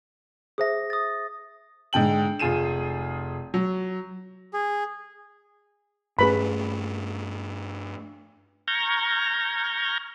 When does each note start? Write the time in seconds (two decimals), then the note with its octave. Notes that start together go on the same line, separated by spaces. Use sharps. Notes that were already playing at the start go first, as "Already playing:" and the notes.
0.58 G#4 C5 E5 D#6 A#6
0.90 D#6 A6
1.93 G#2 D3 G5 F#7
2.39 F1 F4 G#4 D#7 E7
3.54 F#3
4.54 G#4
6.19 G2 A3 C#4 G#4 B4 B5
8.68 A#5 C#6 F6 G6 G#6 A#6